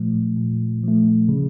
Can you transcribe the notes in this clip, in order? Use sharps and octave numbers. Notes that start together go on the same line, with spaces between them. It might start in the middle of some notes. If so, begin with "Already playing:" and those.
Already playing: A#2 F3 A3
A#2
F3 A3
C#3